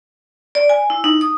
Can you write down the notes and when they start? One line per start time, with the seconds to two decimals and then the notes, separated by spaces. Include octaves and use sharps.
0.55 D5
0.69 G#5
0.90 E4
1.04 D#4
1.21 D#6